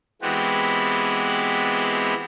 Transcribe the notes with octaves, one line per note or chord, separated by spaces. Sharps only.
E3 G#3 B3 C4 F#4 G4